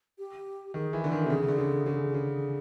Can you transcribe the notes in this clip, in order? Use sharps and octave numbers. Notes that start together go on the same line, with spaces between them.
G4
D#3 G#4
E3
D3 A4
D#3
C3
C#3 G#4
D3
C#3
C#3 G#4
C#3